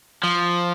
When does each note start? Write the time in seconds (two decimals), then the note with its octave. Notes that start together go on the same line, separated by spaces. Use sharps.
0.23 F3